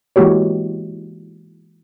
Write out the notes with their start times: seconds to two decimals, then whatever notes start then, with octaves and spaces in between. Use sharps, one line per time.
0.16 E3 G#3 A#3 F#4 G4 C#5